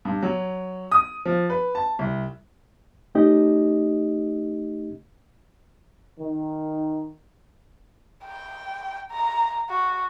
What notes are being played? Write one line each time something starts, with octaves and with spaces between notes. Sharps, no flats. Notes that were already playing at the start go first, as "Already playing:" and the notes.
G2
F#3
D#6
F3
B4
A5
C2
A3 C#4 D#4 G4 D#5
D#3
G5
A#5
F#4